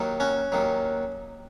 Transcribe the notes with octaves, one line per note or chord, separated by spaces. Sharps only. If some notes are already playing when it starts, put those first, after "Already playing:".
Already playing: D#2 D#3 F#3
C#4 F#4
D#2 D#3 F#3